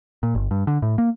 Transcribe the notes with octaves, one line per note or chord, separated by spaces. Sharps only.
A#2
G1
G2
D3
A2
A#3